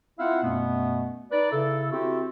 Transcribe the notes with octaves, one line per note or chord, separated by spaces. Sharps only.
C4 E4 F4 F5 F#5
F#2 B2 A3 B3
D#4 B4 D5
C#3 E4 A4
C4 E4 F#4 G4 A4